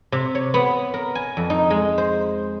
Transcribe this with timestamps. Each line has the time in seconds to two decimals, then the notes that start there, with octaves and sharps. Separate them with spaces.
0.12 C3
0.35 C#5
0.54 B3
0.94 A#4
1.15 G#5
1.37 F2
1.50 D#4
1.70 G#3
1.98 C5